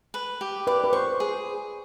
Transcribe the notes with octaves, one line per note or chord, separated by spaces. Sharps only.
B4
G4
B4 D5
B4
C5 C#6
G#4